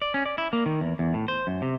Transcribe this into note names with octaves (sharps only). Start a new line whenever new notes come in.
D5
C#4
D5
E4
A#3
D#3
E2
E2
A2
C5
F#2
C3